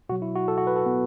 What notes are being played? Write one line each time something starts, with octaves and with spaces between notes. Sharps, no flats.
B2 F#3 F#4
E4
F#4
A4
F#4
B4
A4
B3